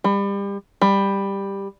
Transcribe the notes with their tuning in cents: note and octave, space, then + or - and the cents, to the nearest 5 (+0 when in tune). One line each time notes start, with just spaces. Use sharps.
G3 +30
G3 +10